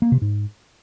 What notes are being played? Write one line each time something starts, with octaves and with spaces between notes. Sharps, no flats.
A#3
C3
G#2